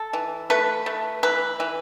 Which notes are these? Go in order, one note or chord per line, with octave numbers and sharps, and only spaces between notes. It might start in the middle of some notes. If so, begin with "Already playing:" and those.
Already playing: A4
E3
A3 B4
A3
E3 B4
E3